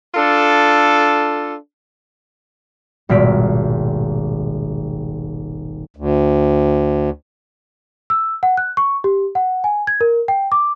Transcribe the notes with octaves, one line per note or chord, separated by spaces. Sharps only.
D4 F4 A4
D#1 G#1 B2 B6 D7
D2
E6
F#5
F#6
C#6
G4
F#5
G#5
G#6
A#4
G5
D6